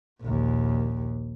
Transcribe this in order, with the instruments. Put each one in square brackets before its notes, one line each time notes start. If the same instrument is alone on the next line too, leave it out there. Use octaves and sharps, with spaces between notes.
[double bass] A#1 D#2